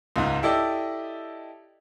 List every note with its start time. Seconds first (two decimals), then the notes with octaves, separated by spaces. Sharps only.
0.16 C#2 G#2
0.43 E4 G4 A4 D5 D#5